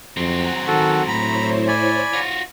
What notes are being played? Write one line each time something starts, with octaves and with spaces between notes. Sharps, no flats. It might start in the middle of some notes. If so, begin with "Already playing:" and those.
F2 F#3 C4 F#5 G#5 A#5
D#3 F#4 A4
A2 E4 C5 C#5 A#5 B5
D5 G#5 B5
F4 F#4